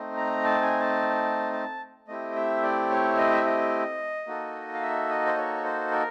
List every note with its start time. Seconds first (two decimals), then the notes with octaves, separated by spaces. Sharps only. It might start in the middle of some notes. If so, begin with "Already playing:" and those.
Already playing: A3 C4 D#4
0.17 A#5
0.44 A5
0.62 G#5
0.80 A5
1.53 A5
2.08 A3 C4 E4 G4 D#5
2.36 E5
2.63 D5
2.90 C#5
3.17 D#5
3.33 E5
3.45 D#5
4.27 A#3 D#4 F#4 A4
4.74 F5
4.82 E5
5.09 D#5
5.27 C5
5.37 C#5
5.64 C5
5.91 A#4